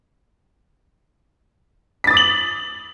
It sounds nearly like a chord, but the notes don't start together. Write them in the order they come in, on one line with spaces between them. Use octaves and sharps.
B6 A6 D#6 D6 F#7